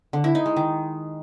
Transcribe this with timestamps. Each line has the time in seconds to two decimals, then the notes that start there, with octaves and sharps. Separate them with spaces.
0.13 D3
0.24 E4
0.35 D#4
0.46 G#3
0.56 D#3